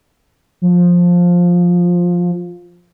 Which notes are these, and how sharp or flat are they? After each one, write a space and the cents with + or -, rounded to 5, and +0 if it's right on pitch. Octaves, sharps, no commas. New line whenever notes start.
F3 +10